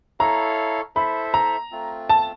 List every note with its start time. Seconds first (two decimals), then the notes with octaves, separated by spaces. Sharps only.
0.20 E4 A4 C#5 F5 A#5
0.96 E4 A4 C5 E5 B5
1.34 A#5
1.72 A3 C4 F4
2.09 A5